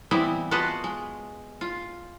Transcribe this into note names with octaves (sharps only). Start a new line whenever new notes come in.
E3 G3 B3 C4 E4 D#5
F4 F#4 G#4 B4 D#5 A5
G#3
F4